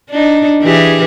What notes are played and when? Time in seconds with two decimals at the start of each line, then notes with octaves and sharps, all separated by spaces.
0.10 D4 D#4
0.63 E3 G4 G#4